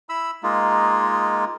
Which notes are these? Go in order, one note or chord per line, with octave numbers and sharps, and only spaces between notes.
E4 B5 E6
G#3 A#3 D#4 F4